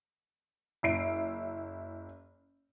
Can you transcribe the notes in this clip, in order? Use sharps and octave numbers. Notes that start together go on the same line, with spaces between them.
F#1 E4 C7 D7